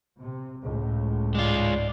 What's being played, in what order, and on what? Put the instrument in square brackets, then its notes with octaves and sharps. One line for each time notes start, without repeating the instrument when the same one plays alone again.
[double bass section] C3
C#2 A2
[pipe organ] G#2 D5 [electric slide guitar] G#3 F4